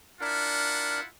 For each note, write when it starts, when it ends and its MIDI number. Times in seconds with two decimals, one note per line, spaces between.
0.21 1.01 62
0.21 1.06 64
0.21 1.06 65
0.21 1.01 70
0.21 1.06 78